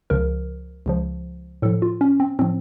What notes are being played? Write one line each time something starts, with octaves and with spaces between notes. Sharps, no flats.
C#2 C#3 F3 A#4
C#2 C#3 F3
A2 F3 A4
F4
C#4
C4
A2 F3 C4